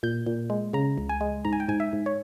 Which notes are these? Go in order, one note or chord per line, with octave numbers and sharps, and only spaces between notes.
A#2 G6
A#2
G#3
C#3 A#5
C#2
G#5
G#3
G#2 A#5
G#5
G5
G#2 G#5
E5
G#2
C#5